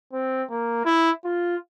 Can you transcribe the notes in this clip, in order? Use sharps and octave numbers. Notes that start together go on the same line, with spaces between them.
C4
A#3
E4
F4